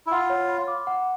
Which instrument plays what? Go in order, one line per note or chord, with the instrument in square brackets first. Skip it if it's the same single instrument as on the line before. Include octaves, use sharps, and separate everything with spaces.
[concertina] E4
[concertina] F4 [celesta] F#5
[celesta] C#5
B5
D6
F#5